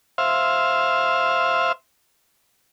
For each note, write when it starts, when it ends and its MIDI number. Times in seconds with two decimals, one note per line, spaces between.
0.18 1.72 72
0.18 1.72 76
0.18 1.72 77